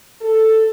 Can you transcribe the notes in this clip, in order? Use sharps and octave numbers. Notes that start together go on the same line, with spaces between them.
A4